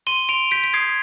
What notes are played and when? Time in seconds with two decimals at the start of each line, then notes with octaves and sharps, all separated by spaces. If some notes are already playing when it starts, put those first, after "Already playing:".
0.07 C6 D#7 G7
0.29 C6 D7 F7
0.51 G6 B6 D7
0.64 B6
0.74 D#6 G#6 C7